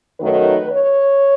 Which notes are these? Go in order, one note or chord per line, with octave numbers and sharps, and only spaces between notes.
F#2 D#3 F#3 A3 D#4 B4
C#5